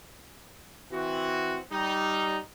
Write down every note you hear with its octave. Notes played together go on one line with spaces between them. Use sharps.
E3 C4 F#4
G3 D#4